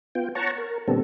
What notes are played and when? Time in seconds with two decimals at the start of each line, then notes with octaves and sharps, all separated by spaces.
0.15 B3 F4 G5
0.35 C#5 F#5 A5 A#5 C#6
0.58 A#4
0.88 A#2 D3 G3 B3 C4 A4